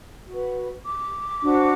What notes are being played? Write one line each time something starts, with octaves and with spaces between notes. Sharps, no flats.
F#4 B4
D6
D4 F#4 C5